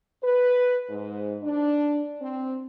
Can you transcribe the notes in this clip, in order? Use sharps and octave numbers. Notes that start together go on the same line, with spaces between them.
B4
G#2
D4
C4